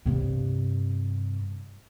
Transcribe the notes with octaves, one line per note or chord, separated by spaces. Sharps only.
G2 C3